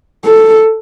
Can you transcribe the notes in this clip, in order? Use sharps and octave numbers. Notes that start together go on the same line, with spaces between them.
A4